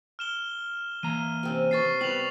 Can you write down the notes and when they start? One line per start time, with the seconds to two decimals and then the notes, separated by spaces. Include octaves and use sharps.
0.19 F6 E7 G7
1.03 E3 A#3 A#5 D#7
1.43 C3 C4 C#4
1.71 C3 B4 C#6 A6 C7
2.01 G3 B3 B4 F7 F#7